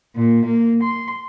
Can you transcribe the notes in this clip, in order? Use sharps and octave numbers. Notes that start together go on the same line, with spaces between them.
A#2
A#3
C6